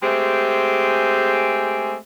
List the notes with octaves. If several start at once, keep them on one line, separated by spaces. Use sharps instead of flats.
G#3 A3 C4 G4 G#4